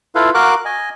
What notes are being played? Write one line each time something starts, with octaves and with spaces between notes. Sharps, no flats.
E4 F4 A4 B4 F5
F#4 A#4 F5 D6 F#6
D#5 G#5